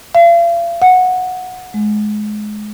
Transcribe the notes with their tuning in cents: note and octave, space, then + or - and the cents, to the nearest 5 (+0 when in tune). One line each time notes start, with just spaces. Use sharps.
F5 -40
F#5 -10
G#3 +25